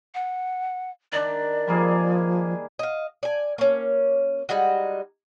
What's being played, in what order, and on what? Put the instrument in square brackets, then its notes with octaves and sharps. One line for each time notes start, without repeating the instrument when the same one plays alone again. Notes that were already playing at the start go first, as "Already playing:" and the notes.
[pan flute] F#5
[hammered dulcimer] D#3 D4 [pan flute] D5
[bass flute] F3 [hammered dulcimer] G3 A#3 G#4
[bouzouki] D#5 F5
D5 G#5
A#3 C#4
G3 G#3 D#4 F#4